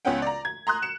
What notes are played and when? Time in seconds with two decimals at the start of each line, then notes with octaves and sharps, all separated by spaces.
0.05 C#2 B3 C#4 F#5 G5
0.22 D5 A#5
0.45 G#6
0.67 A#5 C6 D#6 F#6
0.82 C#7 E7